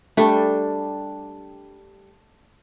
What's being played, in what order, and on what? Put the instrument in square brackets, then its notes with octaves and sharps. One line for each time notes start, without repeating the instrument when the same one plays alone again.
[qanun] G3 D4 [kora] A3